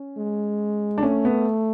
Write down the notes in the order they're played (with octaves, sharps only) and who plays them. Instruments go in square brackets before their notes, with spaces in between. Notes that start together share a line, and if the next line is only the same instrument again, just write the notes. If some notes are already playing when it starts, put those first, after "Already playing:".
Already playing: [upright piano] C#4
[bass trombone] G#3
[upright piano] D4
[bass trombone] A3 [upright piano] C#4
[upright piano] B3